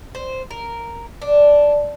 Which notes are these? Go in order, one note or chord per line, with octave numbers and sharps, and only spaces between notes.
C5
A#4
D4